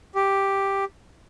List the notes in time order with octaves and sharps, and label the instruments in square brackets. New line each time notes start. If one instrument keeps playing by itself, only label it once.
[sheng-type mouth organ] G4